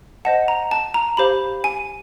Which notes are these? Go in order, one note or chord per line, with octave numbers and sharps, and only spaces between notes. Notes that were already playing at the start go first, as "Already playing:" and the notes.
C5 D#5 F#5 A5
A#5
A5
A#5
G4 C5 F5 B5
G#5